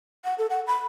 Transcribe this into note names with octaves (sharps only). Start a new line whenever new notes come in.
F#5
A4
F#5
B5